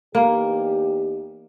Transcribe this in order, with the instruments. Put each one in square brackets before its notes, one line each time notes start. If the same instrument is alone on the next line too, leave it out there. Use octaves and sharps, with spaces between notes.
[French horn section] E2 D#4 G4 [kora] A#3